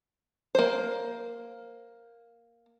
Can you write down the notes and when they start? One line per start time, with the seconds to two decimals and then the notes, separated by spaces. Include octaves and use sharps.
0.55 A#3 C5